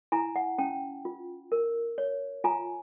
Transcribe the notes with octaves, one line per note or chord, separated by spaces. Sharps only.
E4 G#5 A#5
F#5 G#5
C#4 G5 A5
F4
A#4
C#5
F4 G#5 A#5